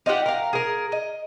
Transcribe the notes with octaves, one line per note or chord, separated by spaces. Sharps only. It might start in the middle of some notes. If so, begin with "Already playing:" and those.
D#4 F4 G4 F#5
A#4 F5
G#4 A#4
D#5